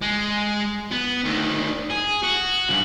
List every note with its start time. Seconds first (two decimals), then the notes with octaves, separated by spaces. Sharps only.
0.02 G#3
0.92 B3
1.24 D2 D#3
1.90 G#4
2.23 F#4
2.70 G2 C#3